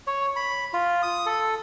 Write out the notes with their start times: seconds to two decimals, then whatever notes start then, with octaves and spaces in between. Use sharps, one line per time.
0.07 C#5
0.36 B5
0.73 F4
1.03 D#6
1.26 A4